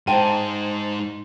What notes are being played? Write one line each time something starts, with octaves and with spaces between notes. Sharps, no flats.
G#2 C5 G5 A5 D#7